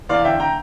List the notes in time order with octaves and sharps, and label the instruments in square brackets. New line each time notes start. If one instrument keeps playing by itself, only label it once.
[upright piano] E2 D5 F5
D3 E5 G5
G5 A#5